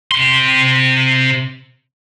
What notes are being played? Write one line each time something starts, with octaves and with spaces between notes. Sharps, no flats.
C3 C6